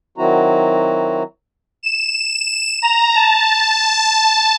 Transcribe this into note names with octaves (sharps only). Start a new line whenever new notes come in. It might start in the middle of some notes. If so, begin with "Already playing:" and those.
D#3 F#3 C4 E4 F#4 A#5
E7
A#5
A5